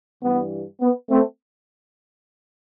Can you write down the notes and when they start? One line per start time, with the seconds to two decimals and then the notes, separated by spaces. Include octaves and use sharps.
0.23 G2 E3 G3 B3
0.81 B3
1.10 A3 C4